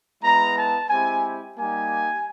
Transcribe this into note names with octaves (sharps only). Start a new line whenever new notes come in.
G#3 B3 E4 A#5
A5
G#3 C4 E4 G4 G#5
G3 A#3 D#4 G4 G#5